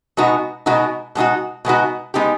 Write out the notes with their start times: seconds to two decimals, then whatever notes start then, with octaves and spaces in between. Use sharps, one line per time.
0.17 B2 G#3 B3 D#4 F#4
0.66 B2 G#3 B3 D#4 F#4
1.15 B2 G#3 B3 D#4 F#4
1.65 B2 G#3 B3 D#4 F#4
2.14 G#3 B3 D#4 G4